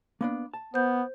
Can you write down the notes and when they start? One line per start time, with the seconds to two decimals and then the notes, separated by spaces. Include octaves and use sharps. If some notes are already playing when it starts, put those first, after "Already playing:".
0.21 A#3 B3 D4
0.54 A5
0.74 B3 C5 G6